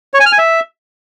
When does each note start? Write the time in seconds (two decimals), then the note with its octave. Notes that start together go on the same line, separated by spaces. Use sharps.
0.14 C#5
0.20 G#5
0.26 F6
0.32 G#5
0.38 E5